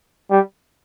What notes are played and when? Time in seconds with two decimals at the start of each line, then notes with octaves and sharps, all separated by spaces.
0.31 G3